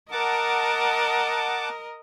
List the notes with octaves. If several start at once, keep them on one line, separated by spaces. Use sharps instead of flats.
A#4 D#5 F#5 A5 D6